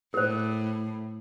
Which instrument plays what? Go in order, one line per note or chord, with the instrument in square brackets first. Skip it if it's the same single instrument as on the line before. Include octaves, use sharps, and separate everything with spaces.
[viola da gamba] A2 [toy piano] A#4 C5